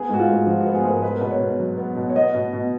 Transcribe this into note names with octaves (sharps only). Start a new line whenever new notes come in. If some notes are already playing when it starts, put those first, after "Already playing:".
Already playing: B3 G#4
G#2 F#4
F4
G#2
F3 F#4
F#4
B3
G#4
G#2 A#4
B3 B4
A#4
B2 B4
C#5
B2
F#3
B3
B2
C#5
B3 D#5
B2
B2